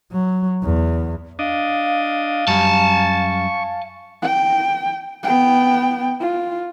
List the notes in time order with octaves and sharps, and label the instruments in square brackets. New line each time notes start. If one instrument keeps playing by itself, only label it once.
[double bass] F#3
E2
[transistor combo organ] D4 D#5 [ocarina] F5
[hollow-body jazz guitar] F#2 G3 [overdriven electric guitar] G#5 A5 [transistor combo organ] C#6
[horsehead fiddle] G5
B3 G5
F4